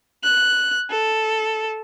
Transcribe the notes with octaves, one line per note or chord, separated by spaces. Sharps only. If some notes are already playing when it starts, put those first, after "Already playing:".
F#6
A4